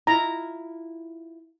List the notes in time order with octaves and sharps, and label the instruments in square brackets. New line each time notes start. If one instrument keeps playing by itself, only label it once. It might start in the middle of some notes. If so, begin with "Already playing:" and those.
[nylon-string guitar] E4 F4 [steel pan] A#5